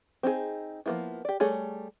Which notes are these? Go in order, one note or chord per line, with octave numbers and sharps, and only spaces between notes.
C4 D#4 G#4
F3 G3 A#3 B3 E4
G4 D5
G3 A3 G#4 C#5